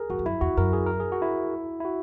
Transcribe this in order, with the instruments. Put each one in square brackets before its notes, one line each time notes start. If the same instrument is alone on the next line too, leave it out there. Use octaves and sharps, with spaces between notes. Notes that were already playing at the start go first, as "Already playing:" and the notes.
Already playing: [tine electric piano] G#4 A#4
[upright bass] F#2 [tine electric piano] F#4
[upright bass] E2
[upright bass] F#2 [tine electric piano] E4
[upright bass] E2 [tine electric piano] F#4
[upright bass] F#2 [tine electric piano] A#4
[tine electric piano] G#4
A#4
G#4
F#4
E4
E4
F#4